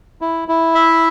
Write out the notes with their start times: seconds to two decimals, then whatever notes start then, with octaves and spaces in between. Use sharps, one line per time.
0.21 E4
0.48 E4
0.75 E5